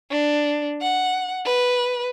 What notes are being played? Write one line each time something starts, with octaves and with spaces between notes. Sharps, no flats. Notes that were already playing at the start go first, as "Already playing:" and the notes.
D4
F#5
B4